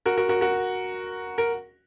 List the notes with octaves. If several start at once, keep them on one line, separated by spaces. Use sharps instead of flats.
F#4 A#4
F#4 A#4
F#4 A#4
F#4 A#4
A#4